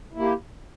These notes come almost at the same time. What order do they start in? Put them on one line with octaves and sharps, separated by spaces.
E4 A#3 G4